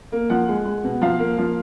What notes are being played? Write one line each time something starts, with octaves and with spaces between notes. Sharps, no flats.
A#3
F3 F#5
G#3
G#3
B2
F3 F5
A#3
F3